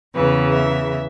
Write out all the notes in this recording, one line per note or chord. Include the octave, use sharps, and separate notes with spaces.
E2 C#3 E3 B4
E5